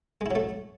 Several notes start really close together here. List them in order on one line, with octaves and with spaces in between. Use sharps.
G#3 E4 F#3 A3